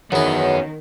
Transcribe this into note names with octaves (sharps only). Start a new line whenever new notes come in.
E2 D#3 F#3 B3 C#4 F#4